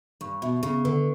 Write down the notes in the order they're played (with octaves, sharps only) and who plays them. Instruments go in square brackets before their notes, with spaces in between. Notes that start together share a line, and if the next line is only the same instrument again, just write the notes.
[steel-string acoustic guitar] G2 [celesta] C#6
[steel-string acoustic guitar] B2 [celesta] E5
[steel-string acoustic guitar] C#3 [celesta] C#6
[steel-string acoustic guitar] D3 [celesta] B4